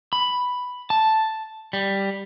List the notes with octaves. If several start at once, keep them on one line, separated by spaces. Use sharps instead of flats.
B5
A5
G3